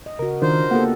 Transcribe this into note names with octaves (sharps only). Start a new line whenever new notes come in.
D#5
C#3 F#4 A#4
D#3 D4 F4 A#4 C5
A#3 B3 D4 F4 G4 A4 F#5